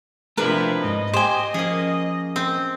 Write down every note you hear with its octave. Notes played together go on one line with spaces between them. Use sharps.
C3 F3 A3 D4 E4 A#4 B4
G#2 D#5
G4 C5 G5 G#5
F3 A#3 C#4 G#4
C4